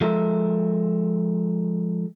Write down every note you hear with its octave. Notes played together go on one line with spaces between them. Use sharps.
F3 G#3 A4 A#4 E5